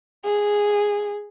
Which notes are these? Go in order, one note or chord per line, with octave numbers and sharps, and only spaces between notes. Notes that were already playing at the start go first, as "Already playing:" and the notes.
G#4